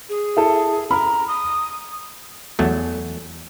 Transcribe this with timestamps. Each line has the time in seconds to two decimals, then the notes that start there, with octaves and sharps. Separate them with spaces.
0.09 G#4
0.37 E4 A4
0.91 A#5 B5 F6
1.28 D#6
2.59 E2 F#3 A3